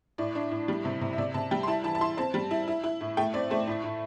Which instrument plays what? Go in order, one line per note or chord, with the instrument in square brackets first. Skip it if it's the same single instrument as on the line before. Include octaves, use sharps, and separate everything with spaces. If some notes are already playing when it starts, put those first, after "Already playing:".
[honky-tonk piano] A2 D5
D4
A2
G3
C3
C3
E5
C3 D5
C3 A5
G3 G5
C6
E4 A5
E3 A5
A5
E4 C6
C4 A5
G3
E4
E4
E4
A2
A3 G5
C4 D5
A3 C5
A2
A2